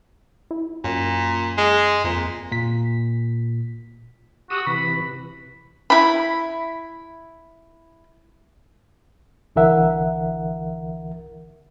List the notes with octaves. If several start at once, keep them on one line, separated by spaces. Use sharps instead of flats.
E4
F#2 A#2
G#3
F2 A#2
A#2 B6
F#4 G4 D#6 E6
C3 E3 B5
E4 B5
C2 D3 E3 A#4 E5 F#5